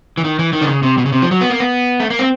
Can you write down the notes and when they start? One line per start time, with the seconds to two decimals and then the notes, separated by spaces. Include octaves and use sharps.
0.18 E3
0.24 D#3
0.39 E3
0.53 D#3
0.61 D3
0.68 C#3
0.83 C3
0.98 B2
1.06 C#3
1.12 C3
1.22 F3
1.31 F#3
1.41 B3
1.50 A#3
1.60 B3
2.00 A3
2.10 A#3
2.19 C4